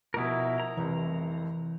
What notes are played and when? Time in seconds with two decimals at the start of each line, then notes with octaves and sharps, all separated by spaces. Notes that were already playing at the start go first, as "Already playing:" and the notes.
0.14 B2 F3 E4 A#4
0.60 A#5
0.77 F1 C2 E3